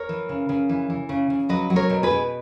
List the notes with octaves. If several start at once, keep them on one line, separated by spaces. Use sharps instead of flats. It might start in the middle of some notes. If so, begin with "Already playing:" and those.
Already playing: A#4 C#5
E3
C#3
C#3
E3
E3
C#3
C#3
F#3 B4 D#5
F#3
A#4 C#5
B2
G#4 B4
B2